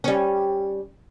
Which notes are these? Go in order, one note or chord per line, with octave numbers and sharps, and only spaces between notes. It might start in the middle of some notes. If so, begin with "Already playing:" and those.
G3 C#4